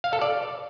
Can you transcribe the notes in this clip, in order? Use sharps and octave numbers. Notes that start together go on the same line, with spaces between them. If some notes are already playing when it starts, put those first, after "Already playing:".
F5
A4
D5